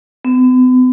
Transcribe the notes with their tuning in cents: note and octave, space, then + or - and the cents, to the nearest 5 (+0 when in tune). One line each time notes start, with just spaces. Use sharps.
B3 +45